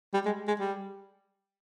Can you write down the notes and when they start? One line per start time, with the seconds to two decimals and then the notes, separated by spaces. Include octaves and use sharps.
0.14 G3
0.26 G#3
0.48 G#3
0.60 G3